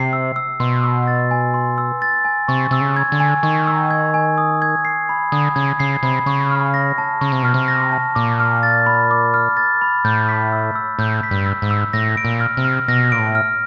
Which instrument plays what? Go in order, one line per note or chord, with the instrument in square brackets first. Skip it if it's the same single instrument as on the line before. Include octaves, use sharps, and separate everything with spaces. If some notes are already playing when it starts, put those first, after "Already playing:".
Already playing: [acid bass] C3 [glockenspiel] C7
[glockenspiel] E6
E6
[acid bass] B2 [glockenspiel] C6
[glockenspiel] E6
A6
G#5
C6
E6
A6
G#5
[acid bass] C3 [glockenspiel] C#6
[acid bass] C3 [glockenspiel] E6
[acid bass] C#3
[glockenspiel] G#6
[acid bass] D3
[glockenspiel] G#5
[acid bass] D#3 [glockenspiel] C#6
[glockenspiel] E6
G#6
G#5
D#6
G#6
C7
B5
[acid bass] D3 [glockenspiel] D#6
[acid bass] C#3 [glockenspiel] G#6
[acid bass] C#3 [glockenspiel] C7
[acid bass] C3 [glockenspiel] B5
[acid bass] C#3 [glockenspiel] C#6
[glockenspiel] F6
A#6
A5
[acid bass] C#3 [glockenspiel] C#6
[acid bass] C3
[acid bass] B2 [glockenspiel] F6
[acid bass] C3
[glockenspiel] A#6
A5
[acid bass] A#2 [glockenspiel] D6
[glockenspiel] F6
A6
B5
D6
F6
A6
B5
[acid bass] A2 [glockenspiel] G6
[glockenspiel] B6
E6
E6
[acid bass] A2 [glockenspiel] G6
[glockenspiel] B6
[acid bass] G2
[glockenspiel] E6
[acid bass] G#2
[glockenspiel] E6
[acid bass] A2 [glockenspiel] A#6
[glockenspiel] D7
[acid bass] A#2
[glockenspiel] F6
[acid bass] C3
[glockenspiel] F6
[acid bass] B2 [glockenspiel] A#6
[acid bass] A#2 [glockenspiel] D7
[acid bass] A2
[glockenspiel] F6